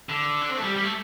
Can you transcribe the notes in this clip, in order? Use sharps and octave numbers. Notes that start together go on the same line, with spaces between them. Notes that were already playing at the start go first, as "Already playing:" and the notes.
D3
D4
C4
A3
G3
G3
A3